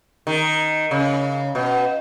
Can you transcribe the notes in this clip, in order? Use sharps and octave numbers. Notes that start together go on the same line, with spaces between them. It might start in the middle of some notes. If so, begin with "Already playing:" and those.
D#3
C#3
B2